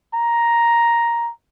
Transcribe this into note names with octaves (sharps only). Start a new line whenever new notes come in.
A#5